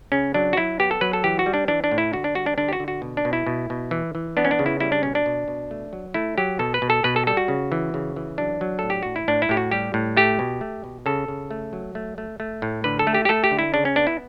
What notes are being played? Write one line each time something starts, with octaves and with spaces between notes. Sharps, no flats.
C#3 C#4
F#3 D4
F#4
F#3 E4
B3 G4
A4
F#3 B4
A4
E3 G4
F#4
G3
D4
E3 D4
D4
A2
E4
D3 F#4
D4
G3 F#4
D4
D3 D4
G4
F#4
D3
F#4
B2
D4
B2
E4
B2
B2
E3
E3
B3 D4
C#4
D4
C#3
E4
G3 E4
D4
B2 C#4
D4
B2
B2
A3
F#3
A3 E4
F#3 G4
B2 A4
B4
B2
A4
B2 B4
A4
G3 A4
F#4
C#3
E3
C#3
E3
F#3 D4
F#3
A2 A4
G4
A2 F#4
E4
A2 D4
E4
A2 G4
F#4
G3 G4
A2
A3 G4
B2
A3
B2
C#3 A4
C#3
A3
F#3
A3
A3
A3
A2
D3 B4
A4
A3
G4
G4
A3 A4
G4
D3
E4
C#3 D4
C#4
B3 D4
E4